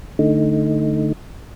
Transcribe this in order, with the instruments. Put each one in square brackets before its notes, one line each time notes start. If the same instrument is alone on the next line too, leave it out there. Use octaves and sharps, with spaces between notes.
[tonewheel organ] D3 A3 D#4